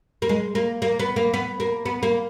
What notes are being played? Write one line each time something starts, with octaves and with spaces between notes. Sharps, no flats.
A#3
G#3
A#3
A#3
B3
A#3
B3
A#3
B3
A#3